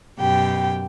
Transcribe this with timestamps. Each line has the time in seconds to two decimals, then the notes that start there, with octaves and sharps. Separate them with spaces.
0.19 F#2 B2 G4 G5